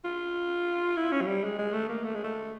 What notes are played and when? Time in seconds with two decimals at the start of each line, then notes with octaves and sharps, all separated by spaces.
0.04 F4
0.96 E4
1.12 C#4
1.21 F#3
1.27 G3
1.43 G#3
1.58 G#3
1.73 A3
1.89 A#3
2.04 A3
2.14 G#3
2.23 A3